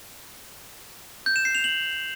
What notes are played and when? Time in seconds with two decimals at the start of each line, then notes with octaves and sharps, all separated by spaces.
1.26 G6
1.36 E7
1.45 C7
1.55 F7
1.64 F#7